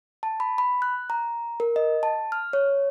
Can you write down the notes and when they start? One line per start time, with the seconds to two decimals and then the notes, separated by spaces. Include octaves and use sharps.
0.23 A5
0.40 B5
0.58 B5
0.82 F#6
1.10 A#5
1.60 A#4
1.76 D#5
2.03 A5
2.32 F6
2.53 C#5